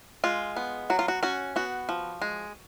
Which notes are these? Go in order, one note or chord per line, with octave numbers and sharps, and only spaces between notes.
G#3 F4
B3
F#3 F#4
F4
F#4
C#4 F#4
B3 F#4
F3
G#3